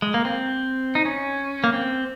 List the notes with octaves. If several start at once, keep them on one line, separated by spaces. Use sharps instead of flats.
G#3
A#3
C4
D#4
C#4
A#3
C4